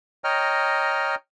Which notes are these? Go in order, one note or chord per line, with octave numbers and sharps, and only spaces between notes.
C#5 D#5 G5 A#5 F6